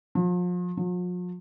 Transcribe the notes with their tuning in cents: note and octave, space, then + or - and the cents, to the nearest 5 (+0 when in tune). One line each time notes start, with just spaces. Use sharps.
F3 +35
F3 +45